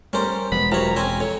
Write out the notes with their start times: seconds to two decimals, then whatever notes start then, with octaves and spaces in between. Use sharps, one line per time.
0.13 G3 C#4 A#4 C5
0.52 E1 F3 G#3 B3 B5
0.72 F#2 F4 G4 C5 C#5 A#5
0.96 C4 C#4 G#5
1.20 F2 C#5